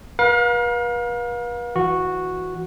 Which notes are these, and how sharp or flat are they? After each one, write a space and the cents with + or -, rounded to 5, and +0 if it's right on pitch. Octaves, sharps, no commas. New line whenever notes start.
B4 -40 F5 +35 A#5 +45
E3 +0 F#4 -10